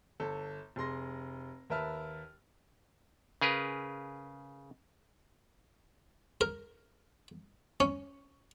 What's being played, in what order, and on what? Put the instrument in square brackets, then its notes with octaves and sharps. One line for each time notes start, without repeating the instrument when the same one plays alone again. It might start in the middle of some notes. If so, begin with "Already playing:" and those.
[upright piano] G1 A4
F1 G#4 C6 A#6
D#2 A#4 B4 E5 A5 F6
[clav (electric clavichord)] C#3 G#4 A#4 B4
[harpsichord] A#4
C#4